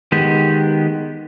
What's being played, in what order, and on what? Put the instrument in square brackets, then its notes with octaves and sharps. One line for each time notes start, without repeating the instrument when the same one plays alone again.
[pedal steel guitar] D#3 G#3 B3 G4